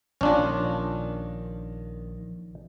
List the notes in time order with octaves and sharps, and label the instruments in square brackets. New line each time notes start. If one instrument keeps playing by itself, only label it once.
[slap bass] A#1 D#3 [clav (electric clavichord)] C#4 D4 F4